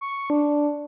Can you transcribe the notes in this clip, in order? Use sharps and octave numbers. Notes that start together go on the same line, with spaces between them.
C#6
D4